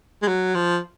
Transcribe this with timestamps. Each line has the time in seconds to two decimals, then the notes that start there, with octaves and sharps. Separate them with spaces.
0.22 G#3
0.28 F#3
0.55 F3